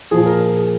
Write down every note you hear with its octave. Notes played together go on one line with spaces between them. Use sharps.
A#2 F3 G#4
A#4
A#4
G#4